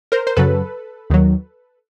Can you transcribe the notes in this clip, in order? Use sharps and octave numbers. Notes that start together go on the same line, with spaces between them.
A#4 C5
C5
F#2 C#3 F#3 A4 B4
D#2 D#3 F#3